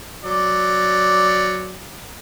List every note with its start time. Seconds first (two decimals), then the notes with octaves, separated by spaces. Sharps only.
0.24 F#3 D5